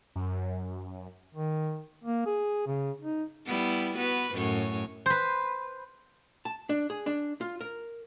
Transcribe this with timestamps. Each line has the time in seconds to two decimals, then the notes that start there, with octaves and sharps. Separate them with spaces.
0.16 F#2
1.35 D#3
2.04 A#3
2.26 G#4
2.67 C#3
3.01 D#4
3.47 G3 B3 E4
3.97 B3 F#4 B4
4.34 F#2 A2 C#5
5.06 B4 C5
6.45 A5
6.69 D4
6.90 G#4
7.06 D4
7.41 F4
7.61 A#4